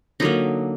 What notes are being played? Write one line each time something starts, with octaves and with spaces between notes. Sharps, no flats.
D3 F#3 A#3 D#4